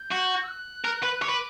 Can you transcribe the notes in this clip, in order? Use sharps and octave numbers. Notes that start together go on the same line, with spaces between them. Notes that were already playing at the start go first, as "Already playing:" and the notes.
Already playing: G6
F#4
E6
F#6
A#4
B4
C#5 D6
B4